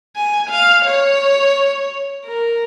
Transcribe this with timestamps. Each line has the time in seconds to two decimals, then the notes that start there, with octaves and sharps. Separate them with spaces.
0.16 G#5
0.50 F5
0.85 C#5
2.25 A#4